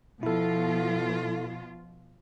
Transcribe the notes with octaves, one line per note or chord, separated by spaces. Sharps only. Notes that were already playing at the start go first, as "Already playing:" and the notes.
B2 F3 E4 F4 A4